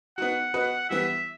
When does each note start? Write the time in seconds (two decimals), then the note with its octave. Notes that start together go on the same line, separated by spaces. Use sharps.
0.18 B3 D#4 F#4 F#5
0.54 B3 F#4 B4 D#5
0.89 E3 G3 B3 E5